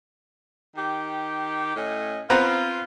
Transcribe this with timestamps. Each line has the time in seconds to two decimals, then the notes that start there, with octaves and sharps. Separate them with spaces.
0.76 D#3 G4
1.76 A2 C#4 D#5
2.30 B3 C4 F4 A#5